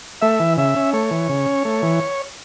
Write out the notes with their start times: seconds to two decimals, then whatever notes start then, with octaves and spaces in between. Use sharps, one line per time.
0.21 A3 E5
0.39 E3
0.57 C#3 E5
0.76 C#4
0.93 A3 C#5
1.11 E3
1.29 C#3
1.46 C#4
1.65 A3
1.83 E3